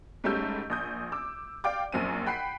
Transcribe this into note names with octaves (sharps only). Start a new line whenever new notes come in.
G#2 G3 A3 C#4 E6 G6
A#1 D#6 G6
D6 E6
D5 F5 G5 D6
A#1 F#2 C4 D#7
F#5 G5 B5 F#6 B6 C7